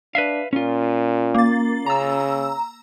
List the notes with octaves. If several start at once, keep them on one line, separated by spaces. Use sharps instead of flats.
D4 B4 E5 F5
A#2 C#4 F4
A#3 A6
C#3 A#5 E6